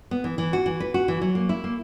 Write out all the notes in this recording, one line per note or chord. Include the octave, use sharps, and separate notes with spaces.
B3
E3
E3
F#4
E3
B4
F#4
E3
F#3
A#3
E4
A#3